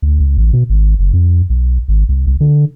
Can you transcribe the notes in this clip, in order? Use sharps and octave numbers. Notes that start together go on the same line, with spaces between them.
D2
C#2
A1
B2
G#1
F#1
F2
B1
G#1
C2
C2
D3